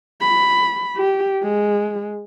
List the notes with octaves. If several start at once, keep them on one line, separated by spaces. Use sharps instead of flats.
B5
G4
G#3